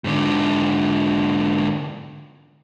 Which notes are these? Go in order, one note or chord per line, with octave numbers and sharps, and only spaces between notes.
G#2 D3